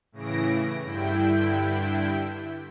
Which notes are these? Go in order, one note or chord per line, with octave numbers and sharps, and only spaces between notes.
A2 C#3 E3 A#6 D7
G2 D3 E4 G5